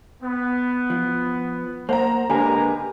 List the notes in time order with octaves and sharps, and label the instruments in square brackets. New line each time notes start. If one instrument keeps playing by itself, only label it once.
[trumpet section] B3
[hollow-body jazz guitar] F3
[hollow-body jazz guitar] A#3 [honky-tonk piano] C5 F#5 A#5
[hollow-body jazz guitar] D3 A#3 [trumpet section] G#3 A#4 A#5 [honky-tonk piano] G4 B4 G#5